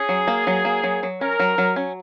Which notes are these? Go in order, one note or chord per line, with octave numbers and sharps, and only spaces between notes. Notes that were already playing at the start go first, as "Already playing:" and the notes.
Already playing: C#4 G#4
F#3
A#3
F#3
A#3
F#3
F#3
C#4 A#4
F#3
F#3
C#4